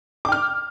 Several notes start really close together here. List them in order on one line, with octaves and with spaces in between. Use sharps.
D6 G5 F6